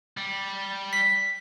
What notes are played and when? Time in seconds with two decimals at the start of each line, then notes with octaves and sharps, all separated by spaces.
0.17 G3
0.93 B6